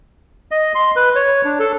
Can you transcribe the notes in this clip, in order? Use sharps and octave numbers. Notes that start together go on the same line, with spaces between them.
D#5
C6
B4
C#5
D4
A4